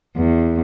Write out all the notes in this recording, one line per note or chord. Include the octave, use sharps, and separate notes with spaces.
E2